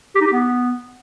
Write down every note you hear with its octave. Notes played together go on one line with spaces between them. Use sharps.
G4
D#4
G4
B3